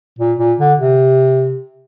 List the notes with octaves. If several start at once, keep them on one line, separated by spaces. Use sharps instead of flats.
A#2
A#2
D3
C3